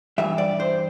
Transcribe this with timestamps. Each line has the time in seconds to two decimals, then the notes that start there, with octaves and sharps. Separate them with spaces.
0.18 G2 E3 G3 E5
0.38 D5
0.60 C5